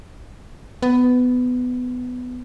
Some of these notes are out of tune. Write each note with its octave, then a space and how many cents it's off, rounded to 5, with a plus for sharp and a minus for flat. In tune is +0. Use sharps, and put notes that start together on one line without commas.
B3 +15